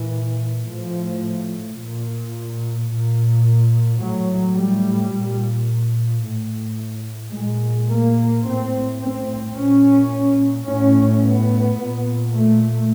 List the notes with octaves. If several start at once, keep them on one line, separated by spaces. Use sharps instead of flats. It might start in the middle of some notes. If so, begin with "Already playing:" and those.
Already playing: A#2 E3
A2 F3
A#2
A#2
A2 F#3
G3
A#2
A2
A#2 G#3
A#3
A2 C4
C4
A#2 C#4
A2 C#4
B3
A#2
A3